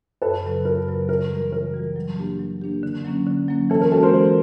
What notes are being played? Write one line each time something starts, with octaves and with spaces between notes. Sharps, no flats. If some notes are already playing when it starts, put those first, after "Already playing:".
F#2 A4 B4
C#3 F#3
F#2 A#4
C#3 F#3
C#3 A#4
E3 G3
C#3 A#4
E3 G3
F#3
A#3 D4 G4
F#3
A#3 D4 G4
D3
F#3 A#3 C#4
D3
F#3 A#3 C#4
E3 A4
A#4
G#3 C#4 F#4 A4
A#4 C5
E3